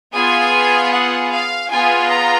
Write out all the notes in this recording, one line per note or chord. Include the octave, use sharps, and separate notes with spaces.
B3 F4 G#4 G#5
F#5
F5
B3 F4 G#4 G#5
A#5